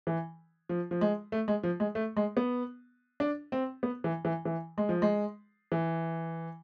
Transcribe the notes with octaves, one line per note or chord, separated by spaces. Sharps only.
E3
F3
F3
G#3
A3
G#3
F3
G#3
A3
G#3
B3
D4
C4
B3
E3
E3
E3
G#3
F3
G#3
E3